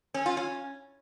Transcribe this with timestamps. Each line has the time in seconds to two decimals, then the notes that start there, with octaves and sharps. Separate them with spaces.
0.14 C#4
0.26 F4
0.37 C#4